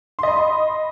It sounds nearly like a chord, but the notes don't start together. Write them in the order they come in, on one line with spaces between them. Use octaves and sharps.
C6 D#5 B5